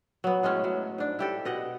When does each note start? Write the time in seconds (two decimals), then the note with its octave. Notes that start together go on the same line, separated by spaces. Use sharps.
0.24 F#3 B3
0.43 A2 G#3 A3 C#4
0.64 F#3
0.98 G#2 D4
1.19 E4 G4 A4
1.45 B2 D#5 F#5